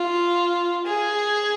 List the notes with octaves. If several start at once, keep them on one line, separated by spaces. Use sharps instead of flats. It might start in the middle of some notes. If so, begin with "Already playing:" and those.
Already playing: F4
G#4